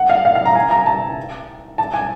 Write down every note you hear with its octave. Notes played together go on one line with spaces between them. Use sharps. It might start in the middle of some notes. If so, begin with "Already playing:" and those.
Already playing: F#5
F5
F5
F5
A#5
G#5
A#5
A5
A5
G#5